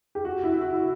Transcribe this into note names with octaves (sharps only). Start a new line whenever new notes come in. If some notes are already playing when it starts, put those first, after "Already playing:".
G4
F#4
E4
F#4
E4